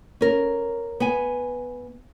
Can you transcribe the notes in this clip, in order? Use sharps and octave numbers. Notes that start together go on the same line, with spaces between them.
C#4 A#4
B3 G#5